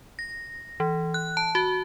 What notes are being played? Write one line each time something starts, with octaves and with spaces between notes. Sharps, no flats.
A#6
E3
F#6
A5
F#4